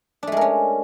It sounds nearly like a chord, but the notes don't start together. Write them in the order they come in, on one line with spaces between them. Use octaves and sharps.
D4 A3 G#3 A#4 C#4